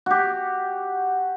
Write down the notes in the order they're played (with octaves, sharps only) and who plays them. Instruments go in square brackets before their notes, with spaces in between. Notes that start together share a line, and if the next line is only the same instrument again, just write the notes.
[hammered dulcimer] F#4 G4